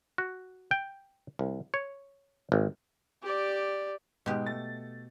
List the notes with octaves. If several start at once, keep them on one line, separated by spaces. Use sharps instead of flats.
F#4
G5
C2
C#5
G#1
G4 D5
G#2 B2 G#3 G4
A3 A6